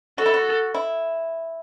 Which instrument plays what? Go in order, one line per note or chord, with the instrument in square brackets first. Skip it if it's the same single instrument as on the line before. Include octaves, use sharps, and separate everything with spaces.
[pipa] F#4 [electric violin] A4
[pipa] E4
F#4
E4